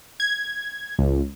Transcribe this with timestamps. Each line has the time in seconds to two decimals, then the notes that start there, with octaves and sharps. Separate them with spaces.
0.20 G#6
0.99 C#2